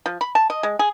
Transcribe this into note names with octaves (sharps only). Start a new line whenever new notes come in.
F3
B5
A5
D#5
G#3
G#4